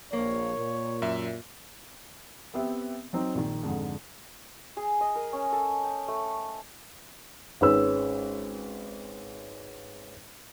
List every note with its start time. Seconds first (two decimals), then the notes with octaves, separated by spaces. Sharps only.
0.13 A#1 A#3 C#5
0.56 A#2
1.02 F#2 E5
2.54 B3 C4 G4 E5
3.13 F#3 C4 D#4
3.35 A#1 D#3
3.63 F2 G#2 D3
4.77 G#4
5.01 D#5
5.15 A#4
5.33 C#4
5.52 A4
5.84 G5
6.08 A3
7.61 G#1 G#3 C#4 B4 E6